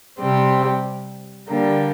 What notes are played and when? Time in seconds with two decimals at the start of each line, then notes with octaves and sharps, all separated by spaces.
0.19 C3 G3 C4 G4
1.48 D3 G3 A#3 G4